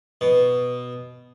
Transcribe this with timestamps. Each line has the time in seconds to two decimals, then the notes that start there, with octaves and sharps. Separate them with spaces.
0.21 B2